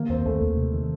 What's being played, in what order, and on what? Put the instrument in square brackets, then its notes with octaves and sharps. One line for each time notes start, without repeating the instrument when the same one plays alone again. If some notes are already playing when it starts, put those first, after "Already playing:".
Already playing: [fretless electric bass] D#3 [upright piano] A#3
[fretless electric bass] D#2 [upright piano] C4
[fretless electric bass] D#2 [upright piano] A3
[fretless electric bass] D#2
C3
D#3